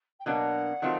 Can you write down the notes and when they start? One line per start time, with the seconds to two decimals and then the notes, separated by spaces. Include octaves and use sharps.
0.19 G5
0.26 B2 F#3 A#3 D4 F#5
0.82 D#3 F#3 A3 C4 F4